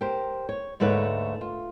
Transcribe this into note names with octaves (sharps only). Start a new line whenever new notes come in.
G4 A#4 C5
C#5
D2 G#2 A3 A#3 B4 C#5
F4